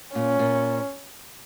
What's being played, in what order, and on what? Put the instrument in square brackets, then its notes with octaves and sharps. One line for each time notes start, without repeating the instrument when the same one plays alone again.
[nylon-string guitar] A#2 [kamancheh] C#4
[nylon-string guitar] A#2